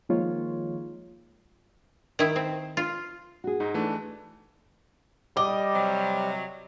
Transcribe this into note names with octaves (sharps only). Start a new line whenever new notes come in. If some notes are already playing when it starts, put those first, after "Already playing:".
D#3 F3 G#3 A#3 F4 C#5
D#3 E4
C4
F4
F#4 G#4
G#2 D#4
E3 A3 D4
G3 D#5 D6
C3 F#3